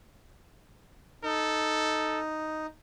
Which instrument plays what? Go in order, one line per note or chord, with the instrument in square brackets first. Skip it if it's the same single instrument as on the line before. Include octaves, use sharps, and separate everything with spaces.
[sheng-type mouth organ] D#4 [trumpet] A4